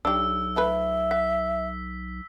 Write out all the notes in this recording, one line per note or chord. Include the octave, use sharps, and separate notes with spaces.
B1 D4 G4 E6
F3 A3 B4 E5
F#5 B6